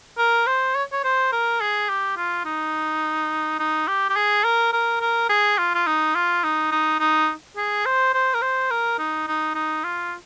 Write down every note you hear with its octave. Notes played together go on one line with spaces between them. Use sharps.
A#4
C5
C#5
C#5
C5
A#4
G#4
G4
F4
D#4
D#4
G4
G4
G#4
A#4
A#4
A#4
G#4
F4
F4
D#4
F4
D#4
D#4
D#4
G#4
C5
C5
A#4
C5
A#4
D#4
D#4
D#4
F4